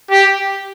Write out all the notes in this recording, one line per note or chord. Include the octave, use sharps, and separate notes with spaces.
G4